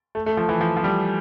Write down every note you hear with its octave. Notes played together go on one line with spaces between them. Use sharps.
A3
A3
F3
E3
F3
F3
G3